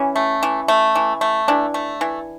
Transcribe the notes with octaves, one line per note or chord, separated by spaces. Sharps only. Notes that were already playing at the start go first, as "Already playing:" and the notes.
Already playing: E3 C#4
A3
E3
A3
E3
A3
E3 D4
A3
E3